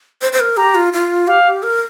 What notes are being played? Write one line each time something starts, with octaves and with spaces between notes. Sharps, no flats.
C5
C5
A#4
G4 A#5
F4
F4
G4 F5
A#4